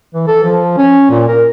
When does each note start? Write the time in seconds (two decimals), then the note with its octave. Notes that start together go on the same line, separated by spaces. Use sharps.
0.14 E3
0.27 A4
0.44 F3
0.78 C#4
1.10 A#2
1.28 A#4